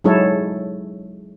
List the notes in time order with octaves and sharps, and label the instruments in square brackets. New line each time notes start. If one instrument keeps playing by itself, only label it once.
[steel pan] F#3 G#3 D#4 E4 A4 C#5